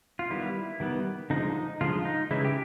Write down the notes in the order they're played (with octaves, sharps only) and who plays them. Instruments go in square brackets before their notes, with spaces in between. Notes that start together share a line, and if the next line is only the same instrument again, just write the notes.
[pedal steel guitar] F4
D#3 G3 B3 E4
D#3 G3 B3
D3 F3 G#3 D#4
D3 F3 G#3 F4
D#4
C#3 E3 G#3 E4
G4